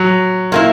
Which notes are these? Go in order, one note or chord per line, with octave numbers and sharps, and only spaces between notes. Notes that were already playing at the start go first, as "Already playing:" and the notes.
Already playing: F#3
A#2 A#3 E4